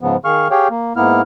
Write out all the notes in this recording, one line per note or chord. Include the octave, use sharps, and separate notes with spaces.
G#2 C#3 F3 B3
D#3 G#4 F5 C#6 F6
G4 G#4 C#5 F5 G5
A#3
G#2 A#3 B3 E4 F6